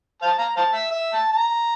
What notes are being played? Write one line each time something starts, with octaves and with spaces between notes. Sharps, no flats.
C5 F5 A5
F5 A#5
C5 F5 A5
E5
E5
A5
A5
A#5